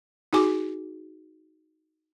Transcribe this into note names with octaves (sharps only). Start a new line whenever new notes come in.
D#4 F#4 G#4 G#5 D6